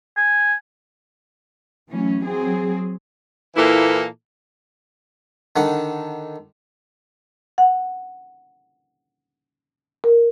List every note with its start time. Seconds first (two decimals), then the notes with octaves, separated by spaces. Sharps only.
0.17 G#5
1.89 E3 F#3 A3 C#4
2.25 F#3 C4 G#4
3.56 A#2 E3 A#3 E4 A4
5.56 D3 D#3 F#5
7.58 F#5
10.04 A#4